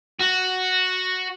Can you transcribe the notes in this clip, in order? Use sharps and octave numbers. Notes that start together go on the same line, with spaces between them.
F#4